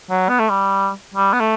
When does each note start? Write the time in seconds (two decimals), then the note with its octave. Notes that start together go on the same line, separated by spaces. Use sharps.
0.10 F#3
0.29 B3
0.39 A3
0.50 G3
1.14 G3
1.33 B3
1.40 A3